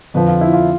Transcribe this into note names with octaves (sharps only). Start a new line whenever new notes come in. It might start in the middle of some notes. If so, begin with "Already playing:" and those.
F2 D3 F3 B4
F4
E4
F4